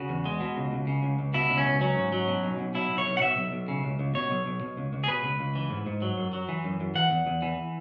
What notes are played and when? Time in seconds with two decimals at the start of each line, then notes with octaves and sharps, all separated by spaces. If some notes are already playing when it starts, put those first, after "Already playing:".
Already playing: C#3 F#4
0.09 E2
0.25 G#3
0.40 B2
0.57 C#2
0.72 C#2
0.87 C#3
1.03 C#2
1.19 C#2
1.34 B2 E4
1.50 C#2
1.58 C#4
1.65 C#2
1.81 F#3 C#4
1.97 G#2
2.12 F#3
2.28 B2
2.43 B1
2.59 B1
2.75 B2 E4
2.90 B1
2.98 C#5
3.06 B1
3.17 F#5
3.21 B2 E5
3.37 B1
3.52 B1
3.68 C#3
3.83 C#2
3.99 C#2
4.15 B2 C#5
4.31 B1
4.46 B1
4.61 B2
4.77 C#2
4.93 C#2
5.04 G#4
5.08 B2 B4
5.24 C#2
5.39 C#2
5.55 E3
5.71 G#2
5.87 G#2
6.02 F#3
6.18 F#2
6.33 F#3
6.49 E3
6.64 F#2
6.80 F#2
6.95 E3 F#5
7.11 E2
7.27 E2
7.42 E3